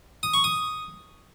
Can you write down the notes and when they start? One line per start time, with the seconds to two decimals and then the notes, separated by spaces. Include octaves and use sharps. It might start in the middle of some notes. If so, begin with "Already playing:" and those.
0.23 D#6
0.34 C#6
0.44 D#6